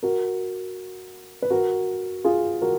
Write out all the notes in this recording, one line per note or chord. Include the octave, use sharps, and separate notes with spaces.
F#4 A#4
B4
F#4 A#4
F4 G#4
F#4 A#4